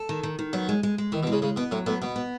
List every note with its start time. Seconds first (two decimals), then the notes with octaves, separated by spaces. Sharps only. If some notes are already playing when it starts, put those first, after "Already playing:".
Already playing: A4
0.09 D#3
0.23 D#3
0.39 D#3
0.53 F#3 B3
0.69 G#3
0.83 G#3
0.98 G#3
1.12 D#3 E3
1.23 B2
1.27 G#3
1.32 C#3
1.42 C#3 G#3
1.56 B2 B3
1.71 A2 F#3
1.86 A2 B3
2.01 B2 B3
2.16 B3